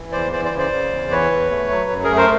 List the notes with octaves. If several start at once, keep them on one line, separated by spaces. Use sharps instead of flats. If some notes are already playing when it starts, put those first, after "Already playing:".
Already playing: E3
E2 C5 D5
E3 C5 D5
C5 D5
C#3
C5 D5
C#3
E2
E3 B4 C#5
E2
A3
F#3
F#2
G#4 A#4
A3
A#4 C5